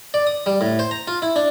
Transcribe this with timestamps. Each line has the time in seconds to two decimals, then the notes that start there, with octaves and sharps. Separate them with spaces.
0.14 D5
0.27 D#6
0.46 G3
0.61 A2
0.79 C5
0.91 A#5
1.08 F4
1.22 E4
1.36 D4